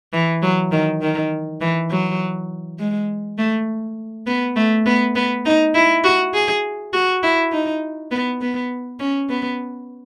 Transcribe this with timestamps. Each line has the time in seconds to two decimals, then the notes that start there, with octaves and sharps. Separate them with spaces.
0.13 E3
0.42 F#3
0.72 D#3
1.01 D#3
1.61 E3
1.90 F#3
2.79 G#3
3.38 A3
4.27 B3
4.56 A3
4.86 B3
5.15 B3
5.45 D#4
5.74 E4
6.04 F#4
6.34 G#4
6.93 F#4
7.23 E4
7.52 D#4
8.11 B3
8.41 B3
8.99 C#4
9.29 B3